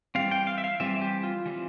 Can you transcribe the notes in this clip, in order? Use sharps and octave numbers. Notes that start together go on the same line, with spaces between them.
E3 G3 C4 F5
G5
F5
E5
F5
E3 G3 C4 E5
G4
F4
E3 G3 C4